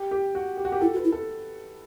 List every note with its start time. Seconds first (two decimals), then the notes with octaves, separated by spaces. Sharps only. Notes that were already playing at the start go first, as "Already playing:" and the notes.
Already playing: G4
0.11 G4
0.35 F#4
0.57 G4
0.65 F#4
0.72 G4
0.81 E4 A4
0.93 F#4
0.96 B4
1.04 E4
1.12 A4